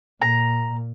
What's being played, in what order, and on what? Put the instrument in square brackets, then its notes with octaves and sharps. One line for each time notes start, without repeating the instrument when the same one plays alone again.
[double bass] A#2 [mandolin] A#5